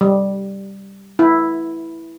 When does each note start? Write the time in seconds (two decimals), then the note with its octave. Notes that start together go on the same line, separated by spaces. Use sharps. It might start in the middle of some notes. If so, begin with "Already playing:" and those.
0.01 G3
1.19 E4